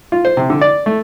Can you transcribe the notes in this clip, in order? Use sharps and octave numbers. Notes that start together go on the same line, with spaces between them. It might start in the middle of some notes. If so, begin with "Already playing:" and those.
F4
C5
C3
D3
D5
A3